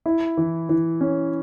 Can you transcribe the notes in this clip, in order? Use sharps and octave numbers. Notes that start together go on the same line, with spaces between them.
E4
E3
E3
C#4